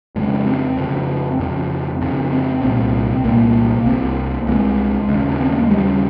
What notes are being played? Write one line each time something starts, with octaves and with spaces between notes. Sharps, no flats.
F2 C#3 G#3
C4
F2 C#3
F2 C#3
F2 C#3 C4
C4
C2 A#2 C4
C2 A#2 A#3
C2 C3
C2 C3 G#3
C#3
D#2
C#4
C4
A#3
G#3
D#2 C#3 G3